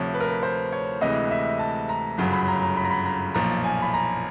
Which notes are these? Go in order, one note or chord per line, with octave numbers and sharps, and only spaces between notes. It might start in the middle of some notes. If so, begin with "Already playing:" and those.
Already playing: D2 C3 F3 C#5
B4
A#4
B4
C5
C#5
D2 C3 E3 G#3 D#5
E5
A5
A#5
G1 F#2 C#3 F#3
B5
A#5
A#5
B5
A#5
B5
A#5
B1 A#2 F3 A#5
G#5
B5
A#5